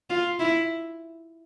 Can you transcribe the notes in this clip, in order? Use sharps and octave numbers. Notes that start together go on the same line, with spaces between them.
F4
E4